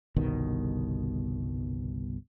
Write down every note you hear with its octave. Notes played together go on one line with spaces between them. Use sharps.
G1 C2 B2 D#3